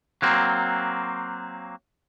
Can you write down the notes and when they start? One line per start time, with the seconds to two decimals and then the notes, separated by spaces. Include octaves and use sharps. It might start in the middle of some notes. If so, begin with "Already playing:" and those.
0.22 F#3 A#3 C4